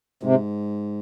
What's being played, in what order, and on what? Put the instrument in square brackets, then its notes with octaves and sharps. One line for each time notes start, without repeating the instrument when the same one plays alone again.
[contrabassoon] G#2 [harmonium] C3